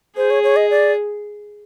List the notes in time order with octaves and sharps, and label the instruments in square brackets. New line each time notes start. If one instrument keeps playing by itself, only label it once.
[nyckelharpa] G#4 [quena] C5
[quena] C#5
C#5
D#5
D5